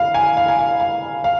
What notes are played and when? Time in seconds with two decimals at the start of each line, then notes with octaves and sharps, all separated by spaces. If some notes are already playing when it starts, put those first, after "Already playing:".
Already playing: F5
0.14 G#5
0.37 F5
0.48 G#5
0.59 F5
0.80 F5
1.24 F5